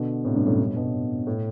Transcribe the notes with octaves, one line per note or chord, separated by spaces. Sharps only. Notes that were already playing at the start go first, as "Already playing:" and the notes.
Already playing: B2 D3
A2 C3
G2 B2
F#2 A2
G2 B2
G2 B2
A2